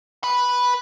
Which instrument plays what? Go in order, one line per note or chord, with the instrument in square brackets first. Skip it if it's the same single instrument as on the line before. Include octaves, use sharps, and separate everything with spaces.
[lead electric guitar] B4 B5